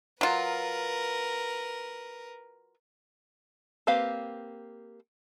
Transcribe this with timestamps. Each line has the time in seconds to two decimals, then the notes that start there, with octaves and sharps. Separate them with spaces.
0.21 F#3 F4 A#4 B4
3.87 A#3 C4 G4 B4 F5